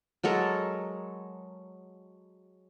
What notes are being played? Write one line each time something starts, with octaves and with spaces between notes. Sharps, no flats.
F#3 G#3 A4 A#4